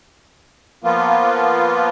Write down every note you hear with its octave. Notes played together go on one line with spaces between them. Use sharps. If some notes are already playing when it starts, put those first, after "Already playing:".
F3 A#3 B3 F4